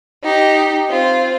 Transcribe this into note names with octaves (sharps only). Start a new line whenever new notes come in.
D#4 G4
C4 F4